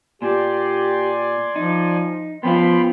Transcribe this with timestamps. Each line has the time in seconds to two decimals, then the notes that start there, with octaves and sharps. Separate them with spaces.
0.22 A#2 G4 D5 G#5 C6
1.56 F3 D#4
2.43 F3 B3 C#4 F4 G5 B5 C6